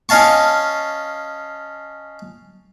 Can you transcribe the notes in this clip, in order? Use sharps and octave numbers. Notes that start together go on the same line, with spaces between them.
C#4 D#5 F5 A5 C#6